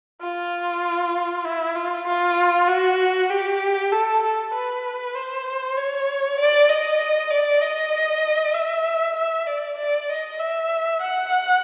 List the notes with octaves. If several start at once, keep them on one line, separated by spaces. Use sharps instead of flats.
F4
E4
F4
F4
F#4
G4
A4
A4
B4
C5
C#5
D5
D#5
D5
D#5
E5
E5
D5
D5
D#5
E5
F#5